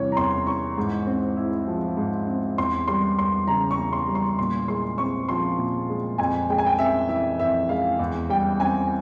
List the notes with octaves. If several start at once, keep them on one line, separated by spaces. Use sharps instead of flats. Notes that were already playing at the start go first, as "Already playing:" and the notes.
Already playing: E2 C3 E3 G3 C#5
A#5
E2 C6
E3 C#6
G#2
C4
E4
F3
G#2
C4
E2 C6
G3 C6
E2 C6
C#3 A#5
C#6
E2
C6
G3
C6
A#2 C6
G#3 C6
C4 C#6
F3 C6
A#2
G#3
F2 G#5
G#3 G5
G#5
G5
C4 E5
E3 E5
F2 E5
G#3 F5
E2
G3 G5
C4 G#5